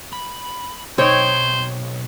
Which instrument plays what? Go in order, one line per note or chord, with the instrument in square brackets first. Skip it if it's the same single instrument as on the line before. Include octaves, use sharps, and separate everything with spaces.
[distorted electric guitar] B5
[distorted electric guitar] B1 [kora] C4 D#4 [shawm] C5 [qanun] C#5 G5